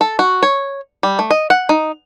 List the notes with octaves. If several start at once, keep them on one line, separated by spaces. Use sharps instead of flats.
A4
F#4
C#5
G3
A3
D#5
F#5
D#4